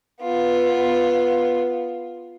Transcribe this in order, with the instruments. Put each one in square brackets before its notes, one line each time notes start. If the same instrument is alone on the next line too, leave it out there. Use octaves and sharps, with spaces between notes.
[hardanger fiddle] B3 F4